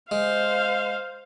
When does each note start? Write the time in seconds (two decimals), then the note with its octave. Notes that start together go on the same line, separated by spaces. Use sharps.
0.11 G#3 C5 F5